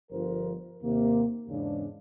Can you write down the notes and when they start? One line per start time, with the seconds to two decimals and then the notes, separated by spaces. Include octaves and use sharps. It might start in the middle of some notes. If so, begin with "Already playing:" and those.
0.11 G1 F3 A#4 C5
0.82 D#2 C3 A#3
1.48 E2 G#2 C#3 D4